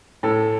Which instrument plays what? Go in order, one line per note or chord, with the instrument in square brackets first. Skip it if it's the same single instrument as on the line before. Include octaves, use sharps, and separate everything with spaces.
[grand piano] A2 A4